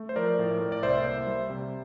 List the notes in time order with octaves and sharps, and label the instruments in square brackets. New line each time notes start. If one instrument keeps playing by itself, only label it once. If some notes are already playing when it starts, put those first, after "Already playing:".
Already playing: [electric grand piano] A3
C5
F3 A#4 D5
A2
A2
D5
C2 C5 E5
A#3
G3
C3